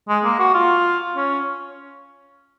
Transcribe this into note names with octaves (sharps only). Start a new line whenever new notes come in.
G#3
A#3
F#4
F4
C#4